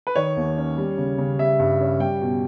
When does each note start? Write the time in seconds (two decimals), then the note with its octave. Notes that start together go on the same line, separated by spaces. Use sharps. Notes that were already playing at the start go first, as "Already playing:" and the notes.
0.07 B4
0.16 D#3 C#5
0.37 D#2
0.57 C#4
0.78 G3
0.98 C#3
1.18 C#3
1.38 G3 E5
1.59 G2
1.80 C#4
2.00 G3 G5
2.21 B2